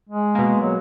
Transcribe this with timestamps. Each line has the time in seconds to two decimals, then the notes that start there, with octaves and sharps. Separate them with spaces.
0.09 G#3
0.35 B2 A#3
0.61 F#3